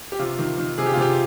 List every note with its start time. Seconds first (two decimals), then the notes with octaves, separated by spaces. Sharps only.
0.12 G4
0.19 C3 F4
0.39 D#3
0.58 D#3
0.78 C3 G#4
0.86 G4
0.94 F4
0.97 C3 G4